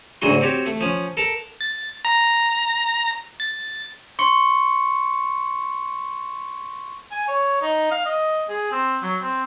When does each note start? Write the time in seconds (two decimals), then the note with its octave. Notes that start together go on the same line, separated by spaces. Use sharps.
0.22 D2 G#2 C#3 F#3 F#4 C6
0.41 C4 F#4 G4 C#5
0.66 A3
0.81 F3 C#4
1.17 A4 A#4 A5
1.61 A6
2.05 A#5
3.40 A6
4.19 C6 C#6 C#7
7.11 G#5
7.27 C#5
7.61 D#4
7.91 F5
8.05 D#5
8.49 G#4
8.71 C4
9.02 F#3
9.21 C4